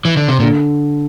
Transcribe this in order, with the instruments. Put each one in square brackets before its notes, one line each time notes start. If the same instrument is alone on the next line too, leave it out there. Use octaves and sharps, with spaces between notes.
[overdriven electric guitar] E3
D3
C3
[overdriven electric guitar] A#2 [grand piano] D3